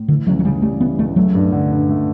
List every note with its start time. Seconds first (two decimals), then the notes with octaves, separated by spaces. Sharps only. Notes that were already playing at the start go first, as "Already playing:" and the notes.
Already playing: A2
0.08 D3 E3
0.27 C#2 F#3
0.39 F#3
0.44 C#3 G3
0.62 G3 A3
0.80 E3 B3
0.99 C#2 A3
1.16 F#3 A3
1.35 G2
1.52 D3
1.71 G2
1.89 A3